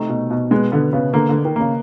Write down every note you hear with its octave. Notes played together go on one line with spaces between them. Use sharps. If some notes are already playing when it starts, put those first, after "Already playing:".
Already playing: C3 A3 D#4
B2
B2
G#3 B3
D3 B3
C#3 B3
D3 A#3
D3 A#3
D#3
C#3 A#3